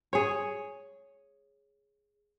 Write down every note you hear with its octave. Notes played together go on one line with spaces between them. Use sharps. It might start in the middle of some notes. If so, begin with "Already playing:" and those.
G#4 C#5